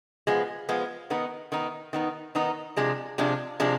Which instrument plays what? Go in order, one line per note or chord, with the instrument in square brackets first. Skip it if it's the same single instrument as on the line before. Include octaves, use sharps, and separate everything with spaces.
[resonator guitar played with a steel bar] F3 G#3 B3
F3 G#3 B3
D#3 B3 D#4
D#3 B3 D#4
D#3 B3 D#4
D#3 B3 D#4
C3 F3 G#3 D4
C3 F3 G#3 D4
C3 F3 G#3 D4